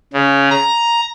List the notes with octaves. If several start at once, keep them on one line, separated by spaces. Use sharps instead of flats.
C#3
A#5